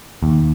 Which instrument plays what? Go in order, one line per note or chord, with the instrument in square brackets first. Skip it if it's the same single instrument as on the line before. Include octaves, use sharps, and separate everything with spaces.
[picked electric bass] D#2